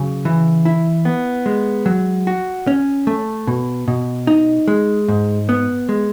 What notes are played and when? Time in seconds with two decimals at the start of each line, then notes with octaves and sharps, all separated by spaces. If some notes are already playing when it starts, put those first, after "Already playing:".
Already playing: C#3 F#3
0.25 E3
0.65 E4
1.05 B3
1.46 G#3
1.86 F#3
2.27 F#4
2.67 C#4
3.07 A3
3.47 B2
3.88 B2
4.27 D#4
4.68 G#3
5.08 G#2
5.49 B3
5.89 G#3